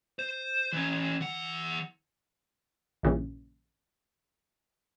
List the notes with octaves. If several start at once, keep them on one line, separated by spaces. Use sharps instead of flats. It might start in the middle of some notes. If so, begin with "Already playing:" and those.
C5
E3 C#4
E3 F#5
A#1 G2 A#2 C#3 E3